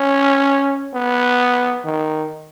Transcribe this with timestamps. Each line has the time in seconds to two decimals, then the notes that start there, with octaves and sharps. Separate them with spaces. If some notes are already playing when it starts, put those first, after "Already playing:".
Already playing: C#4
0.94 B3
1.85 D#3